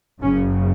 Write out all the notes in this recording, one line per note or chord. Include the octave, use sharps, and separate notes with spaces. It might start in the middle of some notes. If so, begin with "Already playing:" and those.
F#1 F#2 C#3 C#4